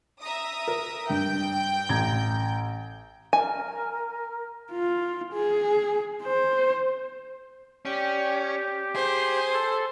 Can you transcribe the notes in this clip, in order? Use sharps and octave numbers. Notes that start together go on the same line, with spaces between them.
E5 A#5 D#6
A#4
G2 G5 G6
A1 A#5 G#6
A#4 G#5
F4
G#4
C5
C#4 G4 D5 G5
G#4 C5 C6
A4